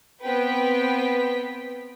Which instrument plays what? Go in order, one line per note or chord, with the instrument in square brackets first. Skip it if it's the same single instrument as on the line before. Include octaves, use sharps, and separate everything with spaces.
[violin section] B3 C4 B4 G5 B6